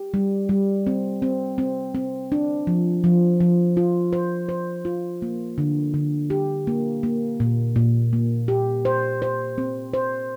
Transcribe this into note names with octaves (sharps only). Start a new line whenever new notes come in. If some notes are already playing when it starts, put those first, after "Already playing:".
Already playing: G4
G3
G3
C4
C4
C4
C4
D4
F3
F3
F3
F4
C5
C5
F4
A#3
D3
D3
G4
A#3
A#3
A#2
A#2
A#3
G4
C5
C5
C4
C5